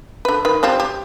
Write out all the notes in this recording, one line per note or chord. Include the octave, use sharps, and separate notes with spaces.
D3 B4
D#3 B4
G3 C4 F4
G4